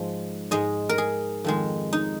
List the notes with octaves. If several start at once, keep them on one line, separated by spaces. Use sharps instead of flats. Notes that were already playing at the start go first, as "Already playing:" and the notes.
Already playing: G#2 F3 G#3
G#2 G#3 D#5
A#4
G#4
F2 D#3 G#3
D#4